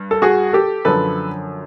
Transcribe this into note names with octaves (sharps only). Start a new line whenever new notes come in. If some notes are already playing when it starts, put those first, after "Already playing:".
Already playing: G2
A4
F#4 G#4
G4 A4
F#2 D3 F3 A4 B4